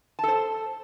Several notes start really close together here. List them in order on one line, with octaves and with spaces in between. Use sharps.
A5 A4 C5